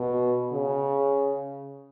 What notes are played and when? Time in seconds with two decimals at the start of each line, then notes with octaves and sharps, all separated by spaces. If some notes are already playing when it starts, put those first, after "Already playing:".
Already playing: B2
0.52 C#3